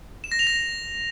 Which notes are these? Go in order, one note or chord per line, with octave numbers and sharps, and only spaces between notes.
E7
A#6
F7
A#6